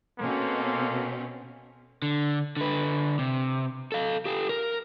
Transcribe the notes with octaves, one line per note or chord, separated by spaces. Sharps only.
B2 A#3 C4 C#4 A4 C6
D3
D3 B4
C3
A4 F5
G4 A4
A#4